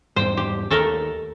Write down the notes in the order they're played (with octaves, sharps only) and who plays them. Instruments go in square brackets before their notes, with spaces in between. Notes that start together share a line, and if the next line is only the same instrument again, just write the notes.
[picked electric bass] E2 G#2 G3 [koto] C5 G5
[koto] G4
[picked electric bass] D#2 [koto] A3 A4 A#4